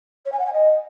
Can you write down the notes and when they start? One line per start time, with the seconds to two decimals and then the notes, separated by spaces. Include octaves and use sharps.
0.25 C#5
0.32 G#5
0.39 F#5
0.46 G#5
0.52 D#5